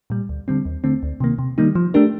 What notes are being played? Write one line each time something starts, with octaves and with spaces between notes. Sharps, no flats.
A#2 G3
D2
D3 G3 C4
D#2
D3 A3 C4
D2
C3 D#3 A#3
C3
D#3 G3 A#3 D#4
F3
A3 D4 G4 A#4